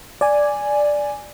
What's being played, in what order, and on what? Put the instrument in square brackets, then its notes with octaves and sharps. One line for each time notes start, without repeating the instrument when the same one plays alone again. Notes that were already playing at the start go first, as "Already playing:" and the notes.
[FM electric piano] D5 G#5